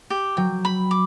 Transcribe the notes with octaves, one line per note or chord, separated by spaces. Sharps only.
G4
F#3 G5
B5
D6